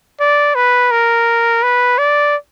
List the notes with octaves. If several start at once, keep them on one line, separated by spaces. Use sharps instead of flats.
D5
B4
A#4
B4
D5